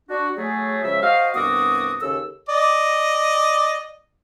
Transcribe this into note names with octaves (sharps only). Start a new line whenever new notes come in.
D4 F#4
F#3 A3 G#4
C#3 F3 G#3 E5
F#4 C5 D#5 F5
C2 G2 B3 F#4 D6 D#6
D#2 C#3 A4 E6
D5 D#5